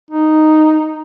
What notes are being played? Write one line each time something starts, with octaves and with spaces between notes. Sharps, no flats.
D#4